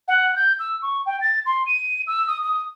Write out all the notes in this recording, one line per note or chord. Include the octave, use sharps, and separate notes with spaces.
F#5
G6
E6
C#6
G5
A6
C6
D#7
E6
D#6
D#6